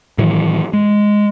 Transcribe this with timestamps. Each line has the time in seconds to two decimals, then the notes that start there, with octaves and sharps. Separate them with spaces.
0.18 A2 D#3 E3 F#3
0.73 G#3